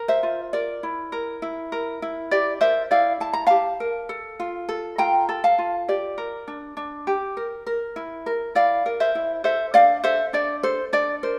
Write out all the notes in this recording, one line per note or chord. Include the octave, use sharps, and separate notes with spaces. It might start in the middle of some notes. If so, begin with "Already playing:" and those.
Already playing: A#4
C5 E5
F4
A#4 D5
E4
A#4
E4
A#4
E4
G4 D5
A#4 C5 E5
E4 D5 F5
E4 A5
A#5
G4 F5 A5
A#4
A4
F4
A4
F4 G5 A#5
A4
F5 A5
F4
G4 D5
A#4
D4
D4
G4
A#4
A#4
E4
A#4
E4 D5 F5
A#4
C5 E5
E4
A4 C5 E5
D4 D5 F5
A4 C5 E5
D4 D5
A4 C5
D4 D5
A#4 C5